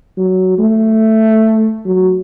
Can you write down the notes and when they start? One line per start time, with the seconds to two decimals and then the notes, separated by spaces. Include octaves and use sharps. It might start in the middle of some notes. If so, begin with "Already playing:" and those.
0.17 F#3
0.59 A3
1.86 F#3